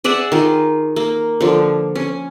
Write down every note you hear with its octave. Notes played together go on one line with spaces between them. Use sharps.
G#4 D5 E5 F#5
D#3 F4
A#3
D3 F3
C#4